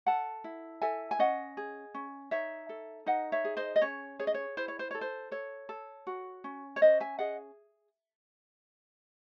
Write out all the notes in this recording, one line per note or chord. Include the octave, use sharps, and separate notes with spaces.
A4 F#5 A5
E4
A4 E5 G#5
G#5
C#4 D#5 F#5
G#4
C#4
D#4 C#5 E5
A4
D#4 D#5 F#5
C#5 E5
G#4
C5 D#5
D#5
C#4 C#5
G#4 C#5
D#5
C#5
E4 C5
C#5
C5
A4 C#5
C5
A4 C#5
A4
F#4
C#4
C#5
C#4 C5 D#5
E5 G#5
G#4 D#5 F#5